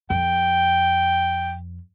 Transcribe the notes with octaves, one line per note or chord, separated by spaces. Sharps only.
F2 G5